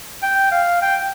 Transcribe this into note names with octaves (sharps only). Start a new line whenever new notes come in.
G5
F5
G5